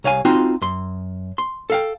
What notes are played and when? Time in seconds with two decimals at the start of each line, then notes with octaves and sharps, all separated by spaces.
0.04 C2 C#5 F5 G#5
0.25 C4 D#4 F4 F#4 G5 C6
0.62 F#2 C6
1.38 C6
1.70 A4 F5 G5